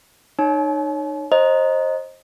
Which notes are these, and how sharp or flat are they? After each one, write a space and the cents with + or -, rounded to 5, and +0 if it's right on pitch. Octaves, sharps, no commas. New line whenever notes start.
D#4 -30 C#5 +0 A5 -45
C5 +25 D#5 +0 A#5 +0